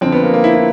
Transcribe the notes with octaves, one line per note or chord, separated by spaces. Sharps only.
F2 D3 C4
B3
A#3
A#3
E4
E4